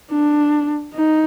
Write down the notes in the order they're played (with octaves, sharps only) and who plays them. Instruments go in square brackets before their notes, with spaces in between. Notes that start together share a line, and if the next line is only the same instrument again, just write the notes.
[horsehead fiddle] D4
D#4